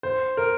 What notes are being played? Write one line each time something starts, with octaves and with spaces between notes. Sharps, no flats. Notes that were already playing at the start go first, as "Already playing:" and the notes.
C5
A#4